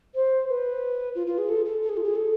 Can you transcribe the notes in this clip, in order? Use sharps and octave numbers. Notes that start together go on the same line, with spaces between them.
C5
B4
F4
F4
G#4
A4
A4
A4
G#4
F4
G#4
A4